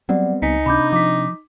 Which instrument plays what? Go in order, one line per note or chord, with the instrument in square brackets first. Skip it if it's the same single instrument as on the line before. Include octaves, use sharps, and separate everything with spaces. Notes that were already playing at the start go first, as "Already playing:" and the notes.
[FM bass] F#3 [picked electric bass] G3 B3 C4 [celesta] D5 F#5
[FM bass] C#2 [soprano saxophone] D#4 [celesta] G#5 B6 C#7
[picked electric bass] C3 D4 [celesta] B5 D6 G6
[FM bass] F3 [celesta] D6 B6